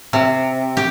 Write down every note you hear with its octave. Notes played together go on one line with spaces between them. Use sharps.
C3
G4